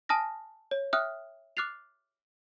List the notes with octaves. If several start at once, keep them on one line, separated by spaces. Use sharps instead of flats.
G#5 A5 D#6 F6 A#6
C#5
E5 G5 D#6 F6 F#6
D6 F6 F#6 A6 C7 F7